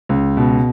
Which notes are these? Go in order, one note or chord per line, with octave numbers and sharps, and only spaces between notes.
C#2
B2